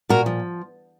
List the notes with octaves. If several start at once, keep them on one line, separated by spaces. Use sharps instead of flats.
A#2 F#4 A#4
F3